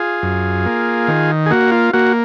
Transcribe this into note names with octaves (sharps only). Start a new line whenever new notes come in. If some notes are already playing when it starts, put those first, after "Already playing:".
Already playing: F4 G#4
F#2
A#3
D#3
G#4
A#3 F#4
F4
A#3 F#4